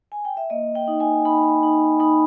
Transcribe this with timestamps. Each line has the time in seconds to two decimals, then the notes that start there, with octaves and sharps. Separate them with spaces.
0.12 G#5
0.25 G5
0.37 E5
0.50 A#3 D#5
0.75 G5
0.88 D#4
1.00 G#5
1.25 D#4 B5
1.63 D#4
2.00 D#4 B5